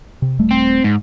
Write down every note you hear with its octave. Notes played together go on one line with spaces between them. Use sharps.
C3
D#1 G3 A3
C4
G#2